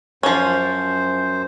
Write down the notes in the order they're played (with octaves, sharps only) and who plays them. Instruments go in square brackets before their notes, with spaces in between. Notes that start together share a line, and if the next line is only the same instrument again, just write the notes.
[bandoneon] F#2 C5 [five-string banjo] F3 C#4